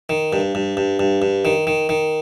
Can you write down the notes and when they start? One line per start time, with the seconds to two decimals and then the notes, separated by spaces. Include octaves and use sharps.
0.09 D#3
0.33 G2
0.55 G2
0.77 G2
1.00 G2
1.22 G2
1.45 D#3
1.67 D#3
1.89 D#3